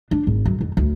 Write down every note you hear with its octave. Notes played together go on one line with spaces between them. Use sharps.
D4
G#1
F#2
F2
D2